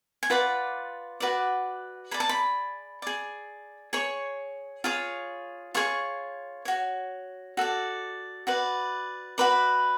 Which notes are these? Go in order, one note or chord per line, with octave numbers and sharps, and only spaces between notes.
G#5
F4 B4 D5 F#5
F#4 B4 D5
G#4 D5 B5
A5
B5
G#4 D5
G#4 C#5 C#6
F4 G#4 C#5
F4 G#4 C#5 C#6
F#4 C#5
F#4 A4 D5
F#4 B4 D5
F#4 B4 D5 B5